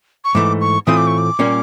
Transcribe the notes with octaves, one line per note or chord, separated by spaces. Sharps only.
C#6
G#2 E3 A3 D6
C#6
A2 E3 A3 C4 F4 D#6
D6
C#6
D6
A#2 G3 A#3 C#4